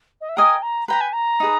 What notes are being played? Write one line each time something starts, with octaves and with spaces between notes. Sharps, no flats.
D#5
E5
A#4 D#5 G5 G#5 D#6
A#5
B4 G5 A#5 B5
G#5
A#5
D#4 G#4 B4